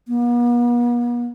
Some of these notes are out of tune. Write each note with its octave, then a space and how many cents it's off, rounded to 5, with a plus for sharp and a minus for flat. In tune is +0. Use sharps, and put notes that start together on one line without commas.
B3 -45